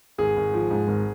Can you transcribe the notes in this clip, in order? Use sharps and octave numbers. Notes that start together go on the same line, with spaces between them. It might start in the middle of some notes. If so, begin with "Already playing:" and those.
G#1 G#4
G#1
F3
G#2
G#1